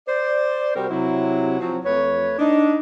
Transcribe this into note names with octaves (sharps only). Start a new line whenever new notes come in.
C5 D5
C3 G3 C4 F#4 A#4 C5
C3 F#3 E4
F3 F#3 C4
F2 A3 B4 C#5
D4 D#4